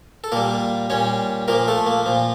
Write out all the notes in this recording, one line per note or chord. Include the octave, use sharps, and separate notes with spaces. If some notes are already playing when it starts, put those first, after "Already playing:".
A4
A#2 G3 A#3 A#4
A#2 G3 C#4 C#5
A#2 F3 A#3 A#4
A3 A4
A#3
A#2 F3